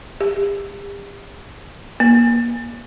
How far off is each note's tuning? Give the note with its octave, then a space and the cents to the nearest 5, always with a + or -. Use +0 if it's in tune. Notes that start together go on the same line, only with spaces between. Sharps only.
G4 +40
A#3 +30